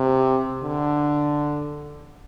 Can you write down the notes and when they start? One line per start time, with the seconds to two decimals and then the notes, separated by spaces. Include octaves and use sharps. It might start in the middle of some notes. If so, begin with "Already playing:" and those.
Already playing: C3
0.63 D3